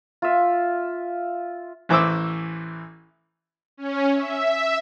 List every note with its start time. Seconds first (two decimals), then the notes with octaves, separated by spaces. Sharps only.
0.22 F4 E5
1.89 A1 E3 C5 D6 E6
3.77 C#4
4.14 E5